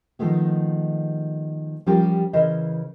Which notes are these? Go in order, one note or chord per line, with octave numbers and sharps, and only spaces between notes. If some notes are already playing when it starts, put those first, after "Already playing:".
D#3 F3 G#3 A3 B3
F3 G3 C#4 F4 G4 A#4
C#3 E3 E4 A#4 C5 D#5